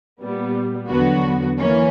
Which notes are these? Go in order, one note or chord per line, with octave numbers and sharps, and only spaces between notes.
A#2 G3 B3
E2 D3 F#3 B3 F#4
E3 A#3 C#4